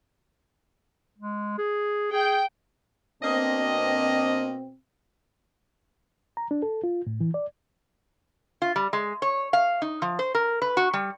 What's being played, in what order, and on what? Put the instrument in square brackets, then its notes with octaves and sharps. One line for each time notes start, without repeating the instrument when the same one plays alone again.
[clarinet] G#3
G#4
[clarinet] G#4 [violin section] G5
[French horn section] B2 C4 [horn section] A#3 D4 D#5
[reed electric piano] A#5
D4
A4
F4
A2
E3
D5
[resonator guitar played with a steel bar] F4
G3
G#3
C#5
F5
D#4
F3
C5
A#4
B4
F#4
G3